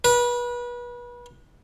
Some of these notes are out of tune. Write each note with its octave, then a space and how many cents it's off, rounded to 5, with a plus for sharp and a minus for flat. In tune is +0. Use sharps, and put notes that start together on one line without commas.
B4 -30